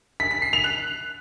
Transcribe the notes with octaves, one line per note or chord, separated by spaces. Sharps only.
B6
B6
C7
F7
F#6